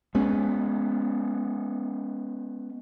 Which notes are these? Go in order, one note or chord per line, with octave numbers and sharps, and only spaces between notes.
G#3 B3 C#4